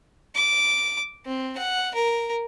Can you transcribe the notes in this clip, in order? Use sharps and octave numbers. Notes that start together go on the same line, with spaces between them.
D6
C4
F#5
A#4